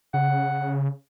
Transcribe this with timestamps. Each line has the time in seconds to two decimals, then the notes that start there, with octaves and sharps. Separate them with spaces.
0.14 C#3 F#5